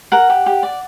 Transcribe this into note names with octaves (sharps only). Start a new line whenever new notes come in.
A#4 F#5
G4
G4
D5